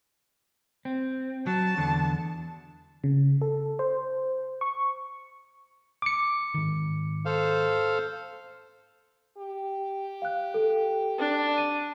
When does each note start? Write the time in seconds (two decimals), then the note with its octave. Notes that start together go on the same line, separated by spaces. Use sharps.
0.85 C4
1.47 F#3 A5
1.77 E2 D3
3.04 C#3
3.41 A4
3.79 C5
4.61 C#6
6.02 D6 C#7
6.54 G#2 D#3
7.25 A4 C5 F5
9.38 G4
10.22 F5 F#6
10.54 A4
11.19 D4
11.58 D#7